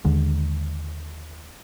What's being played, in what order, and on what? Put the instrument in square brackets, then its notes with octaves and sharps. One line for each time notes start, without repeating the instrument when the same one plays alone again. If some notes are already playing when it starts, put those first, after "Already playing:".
[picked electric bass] D#2 D3 G#3